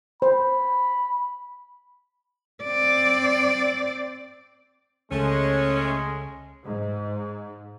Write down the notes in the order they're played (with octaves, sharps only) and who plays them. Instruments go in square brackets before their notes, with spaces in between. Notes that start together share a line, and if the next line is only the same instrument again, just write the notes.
[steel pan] C5 [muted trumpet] B5
[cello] C4 D5
[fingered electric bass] C#2 [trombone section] G#3 [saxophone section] A3 C#4
[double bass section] G#2